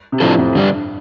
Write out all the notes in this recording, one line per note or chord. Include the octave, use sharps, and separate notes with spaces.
C3
A2 F3 D4 F4 A4
F2
G2 D3 G3 D4